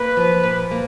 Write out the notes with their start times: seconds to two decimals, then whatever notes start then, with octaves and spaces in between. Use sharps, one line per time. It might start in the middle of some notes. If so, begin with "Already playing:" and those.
Already playing: A#3 B4
0.17 F3
0.44 A#2
0.71 A#3